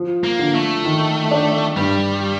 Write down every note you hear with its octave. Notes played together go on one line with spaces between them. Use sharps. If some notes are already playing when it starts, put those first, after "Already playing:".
Already playing: F3
A#3
D3
A3
D#3
D4
G2 G3